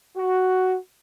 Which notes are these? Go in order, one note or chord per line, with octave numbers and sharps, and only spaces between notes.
F#4